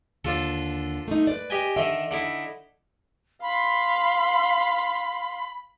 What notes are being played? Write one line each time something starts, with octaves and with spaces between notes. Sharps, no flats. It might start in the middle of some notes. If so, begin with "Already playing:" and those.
D#2 D3 D4 F4 A4
A3 D#4
B4 D5
G4 D#5 G#5
D3 D#3 D#5 E5
D3 D#4 E4
F5 B5 C6